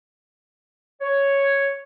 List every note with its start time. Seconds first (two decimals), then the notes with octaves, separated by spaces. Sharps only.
1.02 C#5